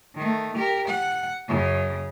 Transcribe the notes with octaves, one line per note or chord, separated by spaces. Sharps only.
D#3 A3
G4 A#4
F#5
F#2 C#3